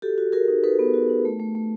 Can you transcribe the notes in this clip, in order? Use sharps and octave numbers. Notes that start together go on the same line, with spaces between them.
F#4 G4 A4
F#4
F#4 G#4 A#4
D#4
D#4 A4 B4
B3
F#4
D#4
A3
A3
A3